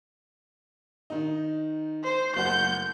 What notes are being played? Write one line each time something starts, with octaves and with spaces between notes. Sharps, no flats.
D#3 D#4
C5
F#1 F#5 G6